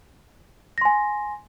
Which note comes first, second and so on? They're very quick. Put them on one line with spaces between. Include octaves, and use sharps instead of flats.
A#6 C6 G#5